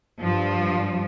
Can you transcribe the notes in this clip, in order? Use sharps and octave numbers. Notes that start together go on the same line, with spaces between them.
G2 F3